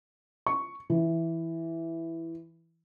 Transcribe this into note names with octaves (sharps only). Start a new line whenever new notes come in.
C#6
E3